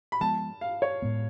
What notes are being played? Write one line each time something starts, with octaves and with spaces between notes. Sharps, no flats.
B5
F3 G#3 B3 A5
F5
C#5
A2 G#3 B3